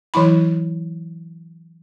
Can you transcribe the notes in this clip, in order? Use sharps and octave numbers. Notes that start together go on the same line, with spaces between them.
E3 F#3 E4 B5